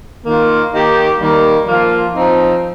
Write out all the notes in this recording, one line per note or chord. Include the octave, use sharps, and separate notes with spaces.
D#3 A#3 F4
D#3 A#3 D#4 G4
D#3 G3 A#3
F3 A#3 F4
F3 C4 D#4